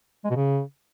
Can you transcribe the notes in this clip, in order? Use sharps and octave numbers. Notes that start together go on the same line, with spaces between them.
G#3
B2
C#3